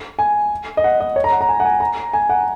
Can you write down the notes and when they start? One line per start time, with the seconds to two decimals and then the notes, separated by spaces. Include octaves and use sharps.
0.19 G#5
0.77 D#5
0.84 F#5
1.00 D#5
1.16 C#5
1.24 A#5
1.32 F#5
1.41 A#5
1.49 G#5
1.60 F#5
1.65 G#5
1.80 A#5
2.13 G#5
2.30 F#5